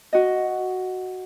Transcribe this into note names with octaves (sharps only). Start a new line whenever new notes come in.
F#4 D#5